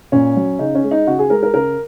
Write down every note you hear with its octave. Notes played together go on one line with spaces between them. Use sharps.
A#2 C#4
F#3
C#3 D#4
C#4
G#3
D#4
C#3 F#4
G#4
G#3 A#4
A#4
C#3 A#4